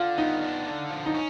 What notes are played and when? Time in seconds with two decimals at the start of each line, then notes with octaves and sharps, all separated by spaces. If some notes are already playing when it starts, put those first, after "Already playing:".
Already playing: D3 F4
0.18 B3 D#4
0.42 D4
0.66 D3
0.90 F3
1.06 D#4
1.15 C#4